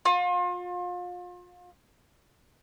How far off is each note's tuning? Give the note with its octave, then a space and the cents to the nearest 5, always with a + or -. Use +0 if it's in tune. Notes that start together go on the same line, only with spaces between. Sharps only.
F4 +35